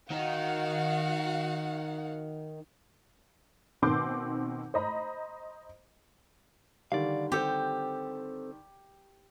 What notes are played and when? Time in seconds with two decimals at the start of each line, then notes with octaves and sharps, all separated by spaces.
0.10 D#3 D#4 F#4 F5 F#5
3.82 B2 D#3 C4 C6 D6 G6
4.74 C5 D#5 A#5 B5
6.92 D3 D#3 G3 D5 F5
7.32 C4 G4 A4 C5